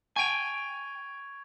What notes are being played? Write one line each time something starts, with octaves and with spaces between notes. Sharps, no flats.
G5 G#5 C#6 G#6 F7